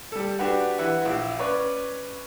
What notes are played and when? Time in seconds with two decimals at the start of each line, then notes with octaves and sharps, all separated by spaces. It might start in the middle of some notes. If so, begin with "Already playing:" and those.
0.12 G3 A4
0.39 D4 F#4 G4 B4 F#5
0.78 E3 B4 E5 F#5
1.02 A#1 E4
1.39 C#4 B4 C#5 D5